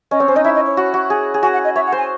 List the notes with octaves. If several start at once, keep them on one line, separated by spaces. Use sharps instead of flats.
C#4 D#5
C4 C#5
C#4 C5
D#4 D#5
E4 E5
D#5
C#5
F#4
F#4
G#4
G#4
F#4 G#5
F#5
D#5
C#5 E5
F#5
C5
G#5